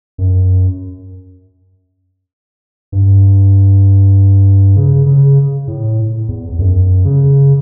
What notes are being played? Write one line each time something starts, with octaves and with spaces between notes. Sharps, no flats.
F#2
G2
C#3
C#3
A2
E2
E2
F#2
C#3